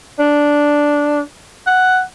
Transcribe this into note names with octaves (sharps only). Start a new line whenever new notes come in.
D4
F#5